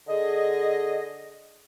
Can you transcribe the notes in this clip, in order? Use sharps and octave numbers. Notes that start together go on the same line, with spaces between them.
D3 G#4 D#5